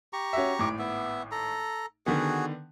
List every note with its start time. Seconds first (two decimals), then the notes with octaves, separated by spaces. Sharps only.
0.13 G4 A#5 C#6
0.33 C#4 F#4 E5
0.59 G#1 A2 D6
0.79 B3 E5
1.31 A4 A#5
2.06 D3 D#3 B3 F#4 G#4